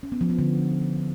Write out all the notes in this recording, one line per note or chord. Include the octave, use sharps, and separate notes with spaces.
C#4
B3
F3
B3
D3